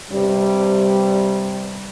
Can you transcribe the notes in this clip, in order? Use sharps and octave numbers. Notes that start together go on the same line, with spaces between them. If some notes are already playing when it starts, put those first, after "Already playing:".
G2 C3 G3